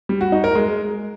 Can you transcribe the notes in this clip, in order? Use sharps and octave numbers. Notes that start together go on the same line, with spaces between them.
G3
F#4
D#4
A#4
G#3